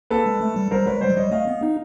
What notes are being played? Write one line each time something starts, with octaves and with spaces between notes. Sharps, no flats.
A#3 A4 B4
G#3
A3
G3
G3 A#4 C5
G#3 B4 C#5
G3 C5 D5
F#3
G3 C#5 D#5
A3 D#5 F5
B3
D#4